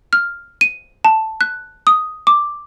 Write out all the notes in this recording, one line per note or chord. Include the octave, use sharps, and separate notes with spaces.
F6
D#7
A5
F#6
D#6
D6